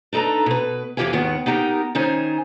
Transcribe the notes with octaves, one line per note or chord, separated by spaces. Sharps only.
D4 D#4 A4 B4 A#5
B2 B4
F2 E3 F4 G4 F5 G#5
D#2 G#2 D#3 B3 F#5
B3 D#4 G4 G#4 A#4
D#3 C#4 D#4 C5 G#5